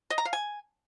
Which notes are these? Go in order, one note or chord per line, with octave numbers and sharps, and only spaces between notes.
D#5
A#5
F5
G#5